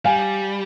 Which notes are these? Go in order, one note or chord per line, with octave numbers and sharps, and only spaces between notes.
G3 F5 G#5